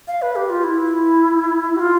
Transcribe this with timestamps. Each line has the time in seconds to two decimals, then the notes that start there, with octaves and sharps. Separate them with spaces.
0.07 F5
0.22 B4
0.36 G4
0.50 F4
0.64 E4
1.76 G4
1.79 F4